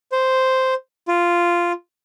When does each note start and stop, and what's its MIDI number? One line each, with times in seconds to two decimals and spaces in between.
0.12 0.74 72
1.08 1.72 65